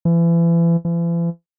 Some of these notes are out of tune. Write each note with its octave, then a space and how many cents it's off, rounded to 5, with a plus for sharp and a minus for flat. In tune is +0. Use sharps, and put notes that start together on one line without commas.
E3 +35
E3 +45